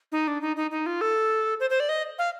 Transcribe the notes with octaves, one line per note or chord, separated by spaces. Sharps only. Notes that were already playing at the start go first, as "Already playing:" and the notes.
D#4
D4
D#4
D#4
D#4
F4
A4
C5
C5
D5
D#5
F5